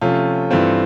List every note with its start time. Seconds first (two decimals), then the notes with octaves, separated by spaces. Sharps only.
0.01 C3 F3 A3 C#4 F4
0.50 G2 E3 A3 C4 F4